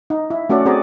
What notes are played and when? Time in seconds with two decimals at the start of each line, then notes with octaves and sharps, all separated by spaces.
0.10 D#4
0.30 E4
0.49 A3 C#4 F#4 A4 D5
0.65 C4 F#4 G#4 D5 A#5